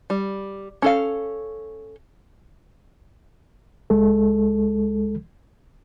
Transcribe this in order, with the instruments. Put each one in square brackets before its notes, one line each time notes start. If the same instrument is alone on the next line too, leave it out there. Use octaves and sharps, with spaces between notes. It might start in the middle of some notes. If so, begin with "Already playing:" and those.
[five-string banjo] G3
C#4 A4 F5
[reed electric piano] C#2 G#3 A4